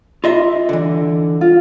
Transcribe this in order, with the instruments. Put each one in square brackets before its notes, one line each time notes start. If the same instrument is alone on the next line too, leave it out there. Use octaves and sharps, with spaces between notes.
[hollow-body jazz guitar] F4 D#5 E5
D3 E3
[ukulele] F4